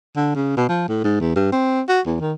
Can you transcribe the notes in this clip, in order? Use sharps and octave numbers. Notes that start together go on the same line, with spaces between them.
D3
C#3
B2
F3
A2
G#2
E2
G2
C4
F#4
E2
D#3